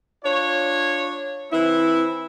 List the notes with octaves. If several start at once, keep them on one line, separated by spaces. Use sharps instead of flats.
D4 F4 C#5
E3 C4 E4